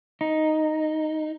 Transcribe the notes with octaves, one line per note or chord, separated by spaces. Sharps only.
D#4